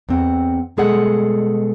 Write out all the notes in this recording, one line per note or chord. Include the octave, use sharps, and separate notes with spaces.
E2 C4 F#5
B2 G3 G#3 G#4 A4 F#5